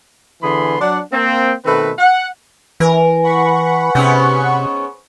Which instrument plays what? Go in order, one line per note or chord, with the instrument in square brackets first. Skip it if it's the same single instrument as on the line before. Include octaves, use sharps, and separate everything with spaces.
[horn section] D3 E3 B3 G#4 B5 C6
F#3 D4 F#5
A#3 C4
B2 D#3 A3 C4 B4
F#5
[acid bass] E3 [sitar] A#4 [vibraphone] B4 G#5
[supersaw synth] F#5 B5 C#6
[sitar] G#2 B3 C#4 [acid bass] C3